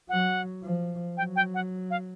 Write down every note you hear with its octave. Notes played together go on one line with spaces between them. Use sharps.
F#3 F#5
F3
F#3 G5
G5
F#5
F5